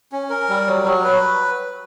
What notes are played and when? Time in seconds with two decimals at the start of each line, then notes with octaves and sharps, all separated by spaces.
0.12 C#4
0.30 A#4
0.49 G3
0.67 F#3
0.85 F#3
1.04 B4